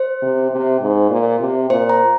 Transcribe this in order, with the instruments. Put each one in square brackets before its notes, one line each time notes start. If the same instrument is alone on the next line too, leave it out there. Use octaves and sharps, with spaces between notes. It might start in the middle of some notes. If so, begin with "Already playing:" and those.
Already playing: [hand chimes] C5
[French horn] C3
C3
G#2
A#2
C3
[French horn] A#2 [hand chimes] C5
[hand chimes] A#5